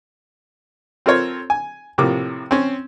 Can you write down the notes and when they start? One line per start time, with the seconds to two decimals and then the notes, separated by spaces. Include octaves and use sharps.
1.06 C4 F4 A4 A#4 C5 C#5
1.50 G#5
1.98 A2 C3 F3 A#3 D6
2.51 C4 C#4